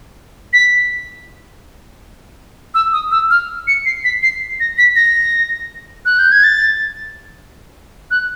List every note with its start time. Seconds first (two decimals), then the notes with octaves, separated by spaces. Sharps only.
0.53 B6
2.74 E6
2.93 D#6
3.11 E6
3.30 F6
3.67 C#7
3.86 C7
4.04 B6
4.23 C7
4.60 A#6
4.78 B6
4.96 A#6
6.05 F#6
6.19 G6
6.32 G#6
6.43 A6
8.11 F#6